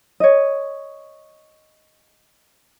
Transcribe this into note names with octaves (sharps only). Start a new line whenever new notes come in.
C#5 D#5